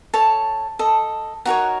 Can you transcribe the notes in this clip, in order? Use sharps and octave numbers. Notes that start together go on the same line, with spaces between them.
A4 C#5 A5
A4 D#5
D#4 F#4 A#4 C#5 F#5